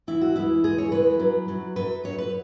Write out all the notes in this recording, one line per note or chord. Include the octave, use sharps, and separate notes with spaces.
E2 E3 G#3 E4
F#4
E2 E3 G#3 E4
E2 E3 G#3 G#4
C#5
E2 E3 G#3 B4
F#2 F#3
F#2 F#3
F#2 F#3 B4
F#2 F#3 C#5
B4